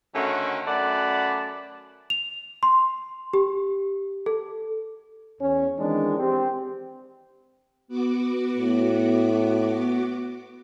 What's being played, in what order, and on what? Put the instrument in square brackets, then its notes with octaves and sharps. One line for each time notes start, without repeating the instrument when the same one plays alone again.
[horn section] D3 D#3 A3 C#4 F#4
F#2 A3 D5 F#5 A5 B5
[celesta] F7
C6
G4
A4
[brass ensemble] E2 C#4 C#5
D#3 E3 G#3 C4 D4
C4 G4
[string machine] B3 F#4 D6
[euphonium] A2